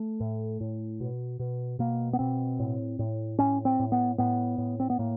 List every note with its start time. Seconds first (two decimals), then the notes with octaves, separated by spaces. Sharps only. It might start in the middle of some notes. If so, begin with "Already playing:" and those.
Already playing: A3
0.20 A2
0.61 A2
1.00 B2
1.39 B2
1.79 B2 A#3
2.13 B3
2.19 B2 C4
2.59 A2
2.99 A2
3.39 A2 C#4
3.65 C4
3.80 A2
3.92 B3
4.18 A2 B3
4.58 A2
4.80 C4
4.90 B3
4.99 A2 A#3